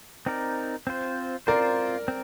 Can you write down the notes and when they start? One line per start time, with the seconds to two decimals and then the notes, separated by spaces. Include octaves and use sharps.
0.26 C4 D#4 A#4 D5
0.87 C4 F4 C5
1.47 C4 F4 A#4 C5 D5
2.08 C4